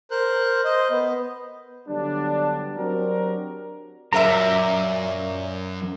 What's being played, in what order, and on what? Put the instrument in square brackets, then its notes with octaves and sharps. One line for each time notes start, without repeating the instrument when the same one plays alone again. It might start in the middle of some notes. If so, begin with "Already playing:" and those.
[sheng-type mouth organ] A#4 C5 F#6
C5 D#5
B3
[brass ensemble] D3 F#3 G3 B3 D4
F#3 C4 D4 F#4 G4 A#4
[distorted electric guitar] F#2 [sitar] A#2 A#4 E5 [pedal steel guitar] A#5